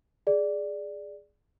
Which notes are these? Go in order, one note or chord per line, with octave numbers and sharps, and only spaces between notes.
G#4 D5